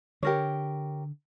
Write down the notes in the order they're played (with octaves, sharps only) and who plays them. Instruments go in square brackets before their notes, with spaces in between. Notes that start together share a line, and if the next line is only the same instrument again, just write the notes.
[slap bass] D3 [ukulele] G4 A#4 C#5